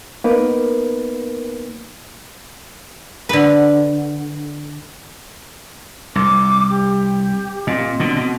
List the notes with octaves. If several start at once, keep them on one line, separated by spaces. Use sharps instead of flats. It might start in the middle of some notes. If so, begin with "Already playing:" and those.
A#3 B3 D#4 A#4 B4
D3 B4
C2 D6
G4
A#2 C4 D#5
B2 D3
B2